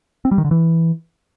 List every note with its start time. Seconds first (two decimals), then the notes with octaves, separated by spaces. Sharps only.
0.25 C4
0.31 G3
0.38 D#3
0.44 D3
0.51 E3